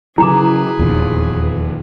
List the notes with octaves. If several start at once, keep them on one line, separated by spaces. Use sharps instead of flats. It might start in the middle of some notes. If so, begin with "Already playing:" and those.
C#3 F#3 E4 G#4 B4 A#5 D6
D#1 E2 A#2 D#3 F3